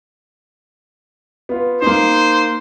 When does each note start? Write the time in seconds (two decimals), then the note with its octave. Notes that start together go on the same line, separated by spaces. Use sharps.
1.49 B3 F4
1.82 A#3 D#4 C5